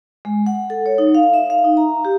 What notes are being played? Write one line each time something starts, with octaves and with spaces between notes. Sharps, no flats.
G#3
F#5
A4
C#5
D#4
F5
E5
F5
D#4
A#5
G4